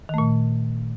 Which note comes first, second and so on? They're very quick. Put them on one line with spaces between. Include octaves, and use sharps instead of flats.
D#3 A3 A#2